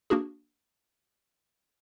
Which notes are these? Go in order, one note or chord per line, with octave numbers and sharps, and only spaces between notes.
A#3 D4 F#4 G#4